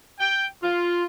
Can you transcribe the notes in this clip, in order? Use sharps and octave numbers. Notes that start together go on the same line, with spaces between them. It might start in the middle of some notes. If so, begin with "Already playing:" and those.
G5
F4